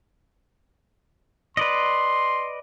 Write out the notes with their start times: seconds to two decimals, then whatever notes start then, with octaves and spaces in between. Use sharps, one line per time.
1.57 B4 D5 D#5 C6